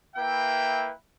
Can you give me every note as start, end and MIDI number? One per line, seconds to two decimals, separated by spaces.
0.16 0.92 58
0.16 0.92 64
0.16 0.92 71
0.16 0.92 76
0.16 0.92 79